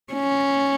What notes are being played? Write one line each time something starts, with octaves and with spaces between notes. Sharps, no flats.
C#4